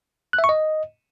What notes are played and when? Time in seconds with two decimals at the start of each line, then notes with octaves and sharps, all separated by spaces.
0.33 F#6
0.39 E5
0.44 C#6
0.49 D#5